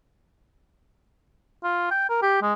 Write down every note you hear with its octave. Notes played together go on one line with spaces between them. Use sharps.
F4
G5
A#4
G4
G#3